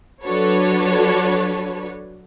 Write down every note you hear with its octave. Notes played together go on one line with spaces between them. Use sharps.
F#3 D4 F#4 A4 B4 C#5